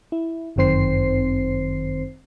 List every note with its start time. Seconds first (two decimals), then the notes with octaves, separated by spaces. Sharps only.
0.12 E4
0.56 G1 F#2 D#3 C4 C5 C7